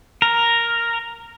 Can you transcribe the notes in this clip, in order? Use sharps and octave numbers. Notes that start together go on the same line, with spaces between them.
A#4